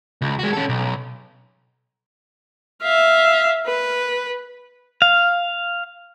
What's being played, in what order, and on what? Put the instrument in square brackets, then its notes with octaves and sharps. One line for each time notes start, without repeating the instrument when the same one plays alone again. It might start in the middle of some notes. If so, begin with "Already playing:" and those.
[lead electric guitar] C#2
G#3 F#4
C#4 A4
B1
[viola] E5 F5
B4
[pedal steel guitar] F5